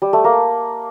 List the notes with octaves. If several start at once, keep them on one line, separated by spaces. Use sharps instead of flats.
G3
A3
A#3